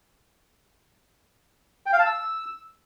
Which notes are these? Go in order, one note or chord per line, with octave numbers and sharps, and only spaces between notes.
G5
F5
A5
E6